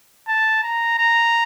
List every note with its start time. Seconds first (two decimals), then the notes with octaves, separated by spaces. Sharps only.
0.28 A5
0.63 A#5
0.99 A#5